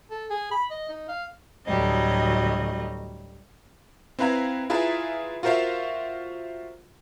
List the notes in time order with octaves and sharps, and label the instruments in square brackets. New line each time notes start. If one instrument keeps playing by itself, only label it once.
[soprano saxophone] A4
G#4
B5
D#5
D#4
F5
[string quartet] D2 A2 F#3 G3 D#5
[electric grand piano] C4 E4 B4 F5 A#5 G#6
E4 F4 G#4 B4 E5 A#5
F4 F#4 A#4 C5 E5 F5